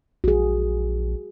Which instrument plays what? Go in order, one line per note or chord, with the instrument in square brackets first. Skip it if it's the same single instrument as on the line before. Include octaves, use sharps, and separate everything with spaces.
[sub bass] A#1 [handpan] F#4 G#4